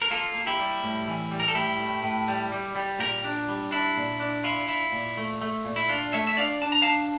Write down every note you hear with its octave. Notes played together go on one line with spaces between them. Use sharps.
A#4
A#3 F4 A4
A#3
E4 G4
G3
A2
E3
G3
A#4
A4
A2 E4 G4
A2
A2
G3
G3
G3
A#2 G4 A#4
D4
G3
D4 E4
A#2
D4
E4 F4
E4
A#2
A3
A3
A#2
E4
D4 F4
A3 C#5 E5
E5
D4 D5 F5
D4 A5
A#5
D4 F5 A5